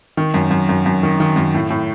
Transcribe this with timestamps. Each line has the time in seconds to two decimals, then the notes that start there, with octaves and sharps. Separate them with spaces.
0.17 D#3
0.34 F#2
0.51 F#2
0.69 F#2
0.86 F#2
1.03 D#3
1.20 D#3
1.36 F#2
1.54 A2
1.70 A2